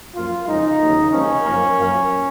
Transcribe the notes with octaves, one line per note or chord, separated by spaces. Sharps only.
F#2 F3 A#3 F4
F2 C#3 F3 G#3 D#4
D#2 C#3 F#3 A#3
C#2 C3 F3 A#3 C#4
F#2 F3 A#3
F#2 F3 A#3